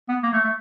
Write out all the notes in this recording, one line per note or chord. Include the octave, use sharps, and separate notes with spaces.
B3
A#3
A3
A3